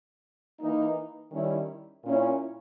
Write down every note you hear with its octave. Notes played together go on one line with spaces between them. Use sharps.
E3 A#3 D#4
D#3 G3 C#4 E4
A#2 A#3 C#4 E4